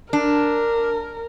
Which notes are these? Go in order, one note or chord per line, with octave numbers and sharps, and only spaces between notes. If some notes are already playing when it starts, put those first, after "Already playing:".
D4 A#4